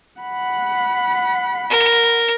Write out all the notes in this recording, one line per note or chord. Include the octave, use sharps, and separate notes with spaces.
F#5 B5
A#4